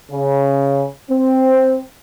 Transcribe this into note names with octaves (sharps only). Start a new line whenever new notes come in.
C#3
C4